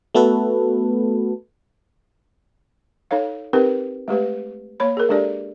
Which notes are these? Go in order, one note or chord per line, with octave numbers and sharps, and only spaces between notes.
A3 B3 F#4 A4 B4
D#4 A4 C#5 F5
C4 D#4 G4 A#4 B4
G#3 A3 G4 B4
A#3 C#5 B5
G#4 A#4
G#3 D4 G4 A4 D5